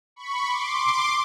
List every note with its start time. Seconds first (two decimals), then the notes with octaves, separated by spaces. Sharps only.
0.16 B5 C#6
0.46 C6 D6